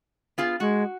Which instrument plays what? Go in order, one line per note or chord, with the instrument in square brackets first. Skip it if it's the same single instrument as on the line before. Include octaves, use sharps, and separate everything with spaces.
[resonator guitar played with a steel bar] B3 F4 G#4
[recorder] G#3 [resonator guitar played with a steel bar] F#4